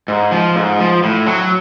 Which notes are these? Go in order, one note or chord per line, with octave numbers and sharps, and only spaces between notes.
G#2
F3
G#2
F3
A2
F#3